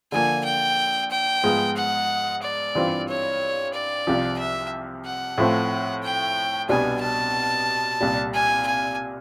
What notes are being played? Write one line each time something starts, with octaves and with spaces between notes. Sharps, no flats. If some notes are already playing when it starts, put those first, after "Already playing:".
D3 F3 A#3 G#5
G5
G5
G#2 F3 G#3 B3
F#5
D5
G2 E3 G3 C4 F4
C#5
D5
C2 C3 F3
E5
F#5
A2 F3 A3 C4
G5
C2 B2 G3 B3 D4 G#5
A5
C2 A#2 G3
G#5
G#5